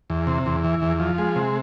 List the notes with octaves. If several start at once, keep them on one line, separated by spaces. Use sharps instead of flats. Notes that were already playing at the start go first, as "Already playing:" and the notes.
E2
C3
E2
E3
E2
F3
G#3
C3